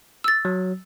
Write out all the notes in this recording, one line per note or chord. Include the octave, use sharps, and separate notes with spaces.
E6 A6
F#3